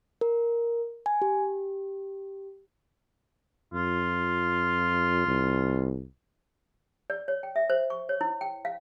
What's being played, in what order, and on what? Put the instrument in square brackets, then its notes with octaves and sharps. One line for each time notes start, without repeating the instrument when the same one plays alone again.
[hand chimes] A#4
G#5
G4
[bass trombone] F2 [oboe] F4
[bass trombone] C2
[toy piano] D5
C#5
G5
E5
C5
C#6
C#5
E4
G5
F5